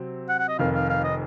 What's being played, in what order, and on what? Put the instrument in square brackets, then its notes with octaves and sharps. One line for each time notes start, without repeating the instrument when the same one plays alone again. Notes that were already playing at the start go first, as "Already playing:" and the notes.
Already playing: [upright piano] C3 F#3 C4
[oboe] F#5
F#5
D#5
[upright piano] F1 F2 D#3 [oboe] F5
[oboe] F5
F5
D#5